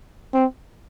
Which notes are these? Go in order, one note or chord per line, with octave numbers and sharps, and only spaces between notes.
C4